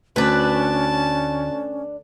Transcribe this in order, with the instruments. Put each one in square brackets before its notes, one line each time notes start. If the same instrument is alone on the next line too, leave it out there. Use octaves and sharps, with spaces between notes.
[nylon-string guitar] D2 [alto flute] C#4 [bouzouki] D4 B4 [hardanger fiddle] A5